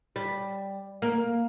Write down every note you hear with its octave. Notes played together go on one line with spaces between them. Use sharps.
G3
A#3